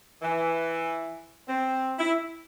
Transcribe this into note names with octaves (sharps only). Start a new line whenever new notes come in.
E3
C4
E4